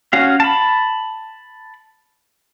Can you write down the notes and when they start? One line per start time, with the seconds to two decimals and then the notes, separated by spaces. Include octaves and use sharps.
0.13 C#4 F#4 F5
0.40 A5 B5